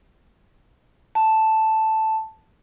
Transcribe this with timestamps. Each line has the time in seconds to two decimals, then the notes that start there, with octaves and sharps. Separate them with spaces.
1.15 A5